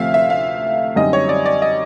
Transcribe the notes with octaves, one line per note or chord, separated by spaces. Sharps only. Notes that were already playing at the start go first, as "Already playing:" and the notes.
Already playing: D2 C3 F3 A3 C4 E5 F5
E5
F5
F#2 D3 G3 C4 D#4 D#5
C#5
D5
D5
D#5